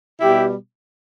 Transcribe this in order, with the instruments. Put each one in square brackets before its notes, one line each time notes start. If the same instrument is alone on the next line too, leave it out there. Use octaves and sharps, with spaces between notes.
[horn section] B2 G3 E4 G4